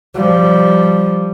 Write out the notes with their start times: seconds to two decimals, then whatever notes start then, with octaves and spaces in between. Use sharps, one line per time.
0.15 F3 G3